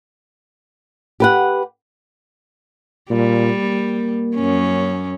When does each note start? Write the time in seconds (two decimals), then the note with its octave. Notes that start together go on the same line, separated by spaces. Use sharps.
1.20 G4 B4 F#5
3.10 A#2 G3
3.58 A#3
4.35 F#2 C#4